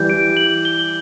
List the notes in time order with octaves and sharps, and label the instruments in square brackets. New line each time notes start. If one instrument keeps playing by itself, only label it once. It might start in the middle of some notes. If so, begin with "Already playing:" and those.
Already playing: [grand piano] E3 G3 [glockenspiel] G6
[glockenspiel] D7
F#7
G7